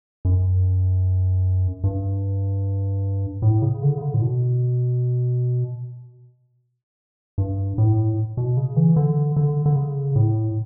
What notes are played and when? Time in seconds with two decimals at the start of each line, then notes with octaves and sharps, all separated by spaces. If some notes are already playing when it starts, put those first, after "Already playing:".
0.25 F#2
1.84 G2
3.42 A2
3.62 C#3
3.82 D3
3.97 C#3
4.01 D3
4.14 A2
4.21 B2
7.38 G2
7.78 A2
8.37 B2
8.57 C#3
8.76 E3
8.96 D3
9.36 D3
9.66 D3
9.76 C#3
10.16 A2